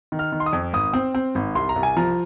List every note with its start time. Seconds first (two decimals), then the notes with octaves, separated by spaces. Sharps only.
0.12 D#3
0.19 F6
0.32 D#3
0.40 C6
0.46 D#6
0.53 F2
0.73 G#1 D#6
0.93 C4
1.14 C4
1.35 G#1
1.55 C2 C6
1.69 A#5
1.76 C2
1.83 G#5
1.97 F3 A#5